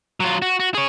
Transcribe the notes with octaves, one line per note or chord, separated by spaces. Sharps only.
F#3 F4
F#4
F#4
G#4 C#5